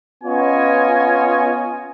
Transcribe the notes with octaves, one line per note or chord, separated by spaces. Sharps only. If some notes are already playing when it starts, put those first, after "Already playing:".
B3 C#4 F4 C#5 D#5 G#5